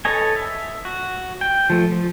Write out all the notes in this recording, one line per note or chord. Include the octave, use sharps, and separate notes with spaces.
A4 B4 C#5 D#5 G#5
E5
F#4
G5
F3 A3
F3